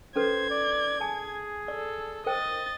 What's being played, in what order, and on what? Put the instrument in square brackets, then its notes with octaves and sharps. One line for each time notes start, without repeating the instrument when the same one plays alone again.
[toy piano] C#4 A4 B4 [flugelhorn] C5 [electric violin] G#6
[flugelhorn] D5
[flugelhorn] G#4 [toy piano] G#5 A5
[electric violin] A4 [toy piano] D5
[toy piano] A#4 C5 G5 [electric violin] D#5 A6